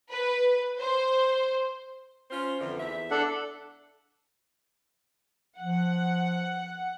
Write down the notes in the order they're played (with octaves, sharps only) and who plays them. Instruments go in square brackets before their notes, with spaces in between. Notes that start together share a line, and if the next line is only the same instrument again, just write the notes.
[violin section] B4
C5
[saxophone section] C#4 F4 C5
F2 D3 E3
E2 E5
[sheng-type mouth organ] D4 A4 F#5
[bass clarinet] F3 [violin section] F#5